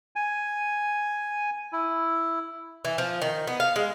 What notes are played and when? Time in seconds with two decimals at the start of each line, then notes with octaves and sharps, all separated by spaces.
0.16 G#5
1.73 E4
2.85 E3
2.98 F3
3.22 D#3
3.47 B3
3.60 F5
3.76 G#3